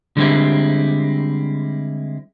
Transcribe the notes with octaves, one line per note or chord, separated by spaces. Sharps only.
D3 G3 G#3 C4 E4